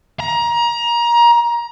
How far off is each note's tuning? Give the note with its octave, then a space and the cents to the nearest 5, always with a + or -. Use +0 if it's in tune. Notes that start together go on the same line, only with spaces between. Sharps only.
A#5 +25